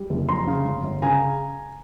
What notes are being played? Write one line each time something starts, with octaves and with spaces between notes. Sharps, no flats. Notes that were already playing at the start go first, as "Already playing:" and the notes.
Already playing: G3
F#1
F2 A#5 C6
C#3
G1
G1
C#3 G#5 A#5